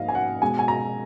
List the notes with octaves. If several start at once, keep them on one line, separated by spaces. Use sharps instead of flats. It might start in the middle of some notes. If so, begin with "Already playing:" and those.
Already playing: G#2 F3 A#3 D#5 F5
G#5
F#5
B2 G#3 G#5
G#5
A#5